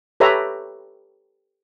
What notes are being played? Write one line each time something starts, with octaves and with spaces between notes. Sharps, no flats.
G4 A4 B4 C#5 E5 A#5